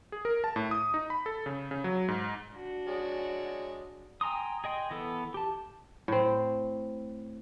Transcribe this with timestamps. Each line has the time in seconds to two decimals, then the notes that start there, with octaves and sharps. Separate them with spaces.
0.12 G#4
0.25 A#4
0.44 A5
0.56 A2
0.71 D#6
0.94 D#4
1.10 B5
1.26 A4
1.46 C#3
1.71 C#3
1.84 F#3
2.08 G#2
2.53 D4 F#4
2.87 G#3 C#5 D5
4.21 G5 G#5 A#5 C6 D#6
4.64 G#4 D#5 G5 C6
4.91 E3 B3 A4
5.34 G4 A5
6.08 A2 C4